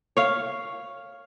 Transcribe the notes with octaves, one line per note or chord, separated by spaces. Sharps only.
C#5 F5